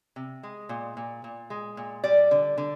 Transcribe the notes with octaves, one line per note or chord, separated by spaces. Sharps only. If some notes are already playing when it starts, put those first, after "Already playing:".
C3
G#3
A#2
A#2
A#2
G#3
A#2
G3 D5
D3
D3